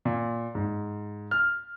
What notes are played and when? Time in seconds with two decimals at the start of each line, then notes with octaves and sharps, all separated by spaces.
0.05 A#2
0.55 G#2
1.31 F6